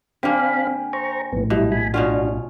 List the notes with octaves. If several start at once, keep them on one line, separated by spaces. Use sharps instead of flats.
D3 A#3 C4 F5 G5 G#5 B5
C5 A#5 C#6
A#1 A2 B3
B2 G3 E4
G#5 B5
B2 C#4 D4 F4 F#4